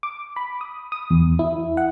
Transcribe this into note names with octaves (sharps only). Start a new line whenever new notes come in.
D6
B5
D#6
D#6
E2
E4
F#5